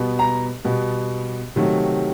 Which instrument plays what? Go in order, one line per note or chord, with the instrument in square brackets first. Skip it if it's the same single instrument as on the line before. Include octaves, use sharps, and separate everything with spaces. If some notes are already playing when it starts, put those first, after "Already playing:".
Already playing: [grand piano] B2 G3 B3
A#5
B2 G3 B3
C3 D#3 F#3 A3